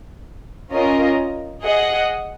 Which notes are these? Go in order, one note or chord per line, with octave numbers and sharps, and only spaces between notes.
C#4 F4 A#4 D#5
G#4 D#5 F#5